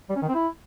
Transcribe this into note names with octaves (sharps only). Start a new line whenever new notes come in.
G3
C#4
D#3
C4
E4